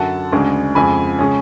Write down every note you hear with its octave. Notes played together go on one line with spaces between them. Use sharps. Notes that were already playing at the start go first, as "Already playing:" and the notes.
Already playing: F#2 D3 F#3 F#5 A5
D2 C#3 G#3 D4
F2 C#3 G#3 G#5 B5
C#3 G#3 C#4